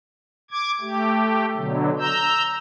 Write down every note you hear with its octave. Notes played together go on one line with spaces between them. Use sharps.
D6 G#6
A3 G4
B2 D3 F#3
A#5 E6 G6